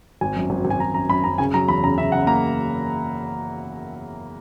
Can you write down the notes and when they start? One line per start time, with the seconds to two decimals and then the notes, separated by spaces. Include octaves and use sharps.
0.21 G#1 G#5
0.36 F#2
0.50 G#1
0.65 G#1
0.70 G#5
0.79 G#1 A#5
0.94 F#2 A#5
1.09 F#2 B5
1.24 F#2 A#5
1.38 C#3 G#5
1.54 F#3 A#5
1.68 E2 B5
1.84 C#3 A#5
1.98 C#3 E5
2.12 C#3 F#5
2.27 A#3 A#5